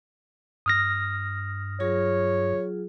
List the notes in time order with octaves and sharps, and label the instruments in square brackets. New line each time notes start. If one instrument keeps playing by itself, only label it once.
[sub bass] G2 [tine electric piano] D#6 F6 A#6
[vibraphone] F#3 F4 G#4 [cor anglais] C#5